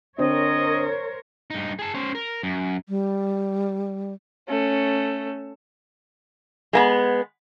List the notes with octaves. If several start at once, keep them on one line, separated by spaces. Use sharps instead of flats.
D3 C4 D4 A#4 C5 C#5 D#5
G2 D#4
G#4 A5
C#4 C5
A#4
F#2
G3
A3 C#4
G#3 A#3 B3